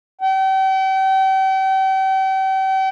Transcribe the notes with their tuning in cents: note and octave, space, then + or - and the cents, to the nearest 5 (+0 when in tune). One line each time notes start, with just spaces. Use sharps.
G5 -40